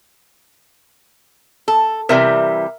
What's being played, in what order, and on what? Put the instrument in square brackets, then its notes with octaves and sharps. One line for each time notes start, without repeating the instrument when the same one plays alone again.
[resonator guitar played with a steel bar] A4
[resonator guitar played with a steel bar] C3 E3 G3 [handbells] A#4 E5